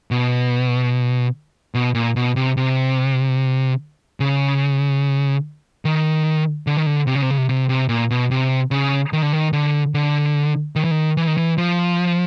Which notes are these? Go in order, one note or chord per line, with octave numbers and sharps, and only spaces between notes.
B2
B2
A#2
B2
C3
C3
C#3
D#3
D3
D#3
D3
C3
C#3
C3
C#3
C3
C3
C3
A#2
B2
C3
C#3
D#3
D3
D#3
D3
D3
D#3
E3
D#3
E3
D#3
E3
F3